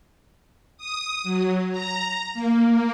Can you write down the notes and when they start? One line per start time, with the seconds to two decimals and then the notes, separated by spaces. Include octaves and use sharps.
0.77 D#6
1.23 F#3
1.71 A#5
2.34 A#3